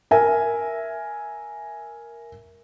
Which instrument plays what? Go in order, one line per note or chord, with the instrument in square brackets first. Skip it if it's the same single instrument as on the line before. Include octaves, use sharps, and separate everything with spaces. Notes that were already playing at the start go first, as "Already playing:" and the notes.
[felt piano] A#4 E5 G#5